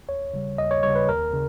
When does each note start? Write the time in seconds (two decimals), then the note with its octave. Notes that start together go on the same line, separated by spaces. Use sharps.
0.08 D#2 C#5
0.33 C#3 G3
0.58 D#2 D#5
0.71 C#5
0.83 C#3 G3 C#5
0.95 B4
1.08 D#2 A#4
1.34 C#3